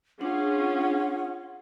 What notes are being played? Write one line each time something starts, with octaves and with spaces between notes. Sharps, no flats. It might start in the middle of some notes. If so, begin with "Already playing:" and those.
C#4 D4 F4 G#4 F#5